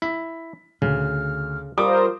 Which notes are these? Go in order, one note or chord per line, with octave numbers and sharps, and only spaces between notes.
E4 B6
D2 C#3 F6
G3 F4 A#4 C5 D6 D#6